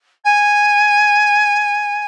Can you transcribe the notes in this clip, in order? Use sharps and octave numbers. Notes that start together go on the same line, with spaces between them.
G#5